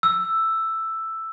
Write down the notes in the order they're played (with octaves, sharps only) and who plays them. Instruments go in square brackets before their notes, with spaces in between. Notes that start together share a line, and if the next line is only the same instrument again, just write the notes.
[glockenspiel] E6